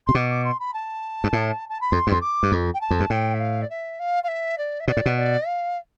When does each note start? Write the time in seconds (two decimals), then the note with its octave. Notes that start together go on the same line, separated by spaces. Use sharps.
0.07 C3 C6
0.15 B2 D6
0.30 D6
0.44 C6
0.60 B5
0.74 A5
1.24 G2
1.33 A2
1.69 A5
1.81 B5
1.92 F2 C6
2.07 G2
2.11 F2 C6
2.21 D6
2.43 G2
2.52 F2
2.74 G5
2.81 A5
2.91 F2
3.00 G2
3.10 A2 G5
3.34 E5
3.40 F5
3.62 D5
3.70 E5
3.99 F5
4.24 F5
4.28 E5
4.58 D5
4.80 E5
4.88 B2 D5
4.97 A2
5.06 B2
5.17 D5
5.46 F5